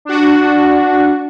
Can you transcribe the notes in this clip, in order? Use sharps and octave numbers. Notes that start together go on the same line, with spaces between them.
D4 F#4